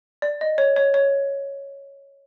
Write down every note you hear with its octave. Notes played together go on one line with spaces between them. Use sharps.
D5
D#5
C#5
C#5
C#5